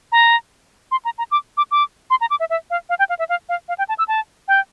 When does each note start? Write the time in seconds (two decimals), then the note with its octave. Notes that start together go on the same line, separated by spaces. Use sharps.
0.12 A#5
0.91 C6
1.05 A#5
1.18 A#5
1.31 D6
1.57 D6
1.71 D6
2.10 C6
2.21 A#5
2.30 D6
2.40 E5
2.50 E5
2.70 F5
2.89 F5
2.99 G5
3.09 F5
3.19 E5
3.29 F5
3.49 F5
3.69 F5
3.78 G5
3.89 A5
3.99 E6
4.08 A5
4.48 G5